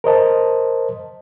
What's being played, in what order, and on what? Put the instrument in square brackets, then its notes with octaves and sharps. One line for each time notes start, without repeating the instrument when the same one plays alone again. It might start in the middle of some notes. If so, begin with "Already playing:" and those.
[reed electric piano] A#4 C5 D#5 A5